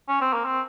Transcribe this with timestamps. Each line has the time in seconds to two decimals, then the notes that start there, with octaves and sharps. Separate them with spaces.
0.09 C#4
0.21 C4
0.33 A#3
0.45 C4